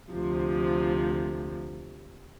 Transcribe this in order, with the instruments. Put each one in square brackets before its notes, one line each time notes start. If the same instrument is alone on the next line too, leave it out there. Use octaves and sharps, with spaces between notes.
[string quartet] D2 C3 F3